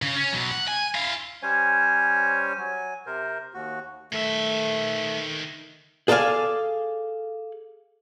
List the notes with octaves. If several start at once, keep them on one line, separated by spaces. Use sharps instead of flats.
C#3
C#4
B2 F#3
F#5
G#5
E4 F5
G3 C#4 C5 C#5 G#5
F#3 G#5
C3 A#4 C5
D#2 F#4
D#3 A3 E5
G#4 A4 D5 D#5 F5 G#5